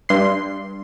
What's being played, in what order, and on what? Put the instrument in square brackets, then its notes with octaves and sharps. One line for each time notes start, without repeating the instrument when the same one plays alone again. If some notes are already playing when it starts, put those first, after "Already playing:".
[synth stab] G2 C6